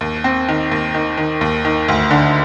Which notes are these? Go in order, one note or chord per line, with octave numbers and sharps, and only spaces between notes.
D#2
C4
D#3
D#2
D#3
D#3
D#2
D#3
D2
D3